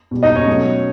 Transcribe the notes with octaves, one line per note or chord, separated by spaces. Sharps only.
B2 G3
D#4 D#5
C#4 C#5
B2 F#3 A3